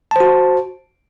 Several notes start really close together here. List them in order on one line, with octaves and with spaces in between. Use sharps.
A5 C5 F#4